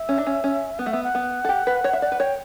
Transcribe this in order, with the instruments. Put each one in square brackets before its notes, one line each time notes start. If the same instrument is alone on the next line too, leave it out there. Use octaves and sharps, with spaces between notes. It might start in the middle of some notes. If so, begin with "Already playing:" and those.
Already playing: [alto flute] E5
[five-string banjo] C#4
D4
C#4
C#4
[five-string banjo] B3 [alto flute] F#5
[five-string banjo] A3
[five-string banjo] B3 [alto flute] E5
[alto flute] F#5
[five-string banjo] B3
A4
G4
B4
C#5
E5
D5
B4
[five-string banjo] C#5 [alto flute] G5